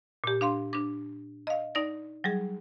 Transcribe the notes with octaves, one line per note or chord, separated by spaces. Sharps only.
A#2 G4
D4 F5 C6
D4 D6
D#5 F5
D#4 D5 A#6
F#3 G3 G#4